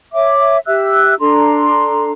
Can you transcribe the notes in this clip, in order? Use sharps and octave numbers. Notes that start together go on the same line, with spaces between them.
C#5 E5 D6
G4 E5 E6 F#6
D4 A4 A#5 C6